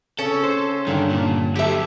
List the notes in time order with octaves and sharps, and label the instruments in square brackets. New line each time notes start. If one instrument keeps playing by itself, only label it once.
[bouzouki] C#3 C#4 [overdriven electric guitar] A4
[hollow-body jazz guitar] C5
[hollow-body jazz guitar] G2 D3 D4 [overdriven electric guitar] D#3
[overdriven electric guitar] A#2
[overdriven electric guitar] F#3 A4 [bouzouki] G4 E5